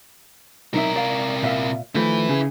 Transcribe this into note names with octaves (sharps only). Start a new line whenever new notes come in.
B1 C3 D#4 A#4 E5
D5 F5
A#2 E5 F5
D#3 F3 A3 E4 B4
C#3 G#4